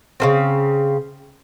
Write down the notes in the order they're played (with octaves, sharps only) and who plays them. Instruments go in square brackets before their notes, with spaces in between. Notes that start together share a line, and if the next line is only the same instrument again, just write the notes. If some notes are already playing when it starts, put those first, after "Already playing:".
[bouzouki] C#3 A#3 C4